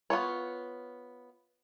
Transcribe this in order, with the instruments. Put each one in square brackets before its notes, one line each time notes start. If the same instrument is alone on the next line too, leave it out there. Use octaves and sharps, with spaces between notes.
[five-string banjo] B3 F4 C#5